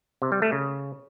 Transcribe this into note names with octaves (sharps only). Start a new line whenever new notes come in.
C3
G3
A3
C#3